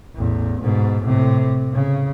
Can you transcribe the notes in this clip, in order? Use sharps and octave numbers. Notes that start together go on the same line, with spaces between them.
A1 E2
G#2 B2
A2 C3
C#3